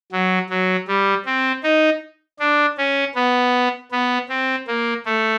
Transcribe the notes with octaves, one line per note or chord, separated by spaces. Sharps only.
F#3
F#3
G3
C4
D#4
D4
C#4
B3
B3
C4
A#3
A3